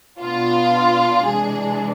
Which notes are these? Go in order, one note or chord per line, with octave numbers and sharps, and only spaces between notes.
B2 B3 D4 F4
C3 E3 G#3 D4 G#4